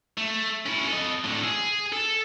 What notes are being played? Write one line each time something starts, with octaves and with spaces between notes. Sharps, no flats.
A3
C#4 E4
A4 D#5
A2 D3
G#4
A4